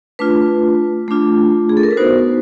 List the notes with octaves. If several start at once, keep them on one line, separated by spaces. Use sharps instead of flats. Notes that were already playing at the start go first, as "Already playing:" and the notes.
A3 D4 F4 B4
A3 D4 F4
G#4
A4
A#4
B4
B3 D#4 F#4 C5